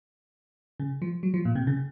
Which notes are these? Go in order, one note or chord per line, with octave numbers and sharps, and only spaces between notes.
C#3
F3
F#3
F3
A#2
C3
C#3